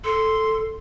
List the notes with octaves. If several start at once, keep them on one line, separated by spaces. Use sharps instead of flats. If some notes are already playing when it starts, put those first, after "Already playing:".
A4 C6